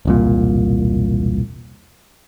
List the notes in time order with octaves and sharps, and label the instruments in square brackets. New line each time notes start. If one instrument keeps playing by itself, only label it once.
[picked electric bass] E1 C2 A#2